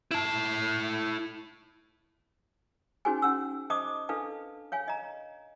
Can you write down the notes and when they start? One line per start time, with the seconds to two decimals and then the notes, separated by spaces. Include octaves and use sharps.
0.11 E4 A5
3.05 C#4 D#4 F#4 G#4 C5 G#5
3.22 C#4 F#5 E6
3.70 C5 D#5 A5 D6 D#6
4.09 D4 A4 B4 F5 A5
4.72 C#5 F5 G#5
4.88 D#5 A#5